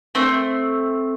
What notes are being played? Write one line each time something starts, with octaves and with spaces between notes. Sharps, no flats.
A3 C4